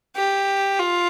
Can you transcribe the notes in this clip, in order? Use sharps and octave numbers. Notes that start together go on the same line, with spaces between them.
G4
F4